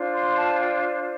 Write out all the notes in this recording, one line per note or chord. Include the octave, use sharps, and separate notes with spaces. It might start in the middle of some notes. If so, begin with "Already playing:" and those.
Already playing: D4 F4 C5
C6
A5
G5